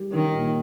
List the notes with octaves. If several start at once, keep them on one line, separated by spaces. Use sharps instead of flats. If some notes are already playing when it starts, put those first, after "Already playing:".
Already playing: G3 G4
D#3 C#4
A#2